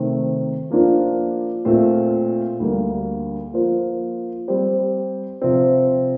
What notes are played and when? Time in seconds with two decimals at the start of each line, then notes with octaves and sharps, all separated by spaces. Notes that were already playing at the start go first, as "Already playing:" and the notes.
Already playing: C3 D#3 A3 C4
0.70 F3 A#3 D4 F4 C5
1.65 A#2 A3 C4 F4 C5
2.60 D2 D3 G3 A#3
3.53 F3 A#3 F4 C5
4.48 G3 C4 G4 C5
5.42 C3 F3 C4